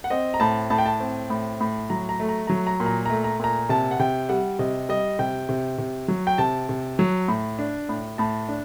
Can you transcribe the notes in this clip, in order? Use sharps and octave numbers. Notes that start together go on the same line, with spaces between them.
F#5
C4 D#5
A#5
A2 A5
A2 A5
G5
A5
C4
A2
A2
F#3 A#5
A#5
A3
A#5
F#3 A#5
A#5
A#2
A#5
A3 A#5
A#5
A#2 A#5
C3 A5
F#5
C3 G5
G3 F#5
C3 D#5
G3 D#5
C3 G5
C3
C3
F#3
G5
C3 A5
C3
F#3
A2
D4
A2
A2 A5
D4